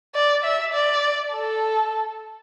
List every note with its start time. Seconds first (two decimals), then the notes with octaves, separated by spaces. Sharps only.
0.15 D5
0.44 E5
0.73 D5
1.32 A4